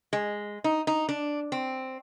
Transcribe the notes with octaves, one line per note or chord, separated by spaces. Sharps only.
G#3
D#4
D#4
D4
C4